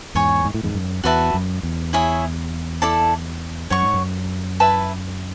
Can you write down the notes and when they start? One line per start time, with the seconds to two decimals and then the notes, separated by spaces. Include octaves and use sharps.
0.15 E2 G#2 C#5 G#5 C#6
0.45 G#2
0.54 A2
0.63 E2 G#2
0.74 F#2
1.04 E2 F#4 B4 E5 A5
1.34 F#2
1.63 E2
1.93 E4 G#4 C#5 E5
2.82 E4 A4 D5 A5
3.70 F#2 C#5 F#5 C#6
3.82 G#2
3.94 F#2
4.60 E4 B4 E5 A5